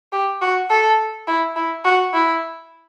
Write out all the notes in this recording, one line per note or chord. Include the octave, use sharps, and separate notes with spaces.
G4
F#4
A4
E4
E4
F#4
E4